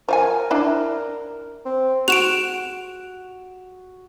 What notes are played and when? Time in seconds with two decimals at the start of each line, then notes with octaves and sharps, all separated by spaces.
0.09 F3 A#4 F5 G#5
0.51 D4 E4
1.65 C4
2.08 F#4 D7 E7 F7